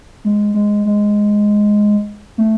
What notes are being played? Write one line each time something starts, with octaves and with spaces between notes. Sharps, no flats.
G#3
G#3
G#3
A3